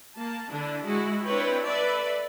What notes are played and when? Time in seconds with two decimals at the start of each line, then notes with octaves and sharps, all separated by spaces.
0.17 A#3 A5
0.50 D3 D4 E4
0.85 G#3 E4 F#4
1.24 C4 D4 E4 B4 C#5 G5
1.65 A4 B4 D5 E5 B5